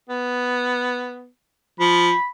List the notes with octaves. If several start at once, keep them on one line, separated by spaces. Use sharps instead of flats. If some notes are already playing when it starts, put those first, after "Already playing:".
B3
F3 B5